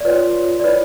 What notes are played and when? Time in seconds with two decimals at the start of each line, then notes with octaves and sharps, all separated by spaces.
0.01 D5
0.05 F4 B4 C#5
0.60 D5
0.64 E4 B4 C#5